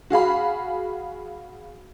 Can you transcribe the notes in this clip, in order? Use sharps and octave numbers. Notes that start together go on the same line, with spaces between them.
F#4 G#4 F5 B5